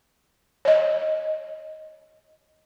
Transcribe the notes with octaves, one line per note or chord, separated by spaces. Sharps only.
C#5 D#5